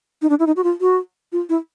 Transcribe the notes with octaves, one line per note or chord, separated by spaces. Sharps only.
D#4
D4
E4
D#4
F#4
F4
F#4
F4
E4